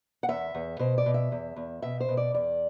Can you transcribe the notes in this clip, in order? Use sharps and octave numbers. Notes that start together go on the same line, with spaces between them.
F#5
E2 E5
E2
B2 C5
D5
B2
E5
E2
E2
B2 E5
C5
B2
D5
E2 D5